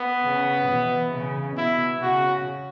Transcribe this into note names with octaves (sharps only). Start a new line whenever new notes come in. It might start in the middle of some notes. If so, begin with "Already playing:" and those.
Already playing: B3
C#3
B2 E3
C#3
B2 E4
C#3 F#4